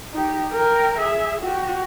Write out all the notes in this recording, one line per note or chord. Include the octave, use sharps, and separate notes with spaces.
D#4 G4
A#4 G5
G#4 E5
F#4 G4